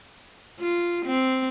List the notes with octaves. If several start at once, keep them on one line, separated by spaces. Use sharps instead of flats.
F4
C4